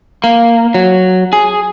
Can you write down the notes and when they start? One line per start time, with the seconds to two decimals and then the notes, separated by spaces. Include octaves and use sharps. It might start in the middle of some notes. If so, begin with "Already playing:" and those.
0.24 A#3
0.74 F#3
1.33 G#4